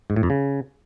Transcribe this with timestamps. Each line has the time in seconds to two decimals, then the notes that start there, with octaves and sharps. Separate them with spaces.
0.10 G#2
0.16 A2
0.23 F2
0.30 C#3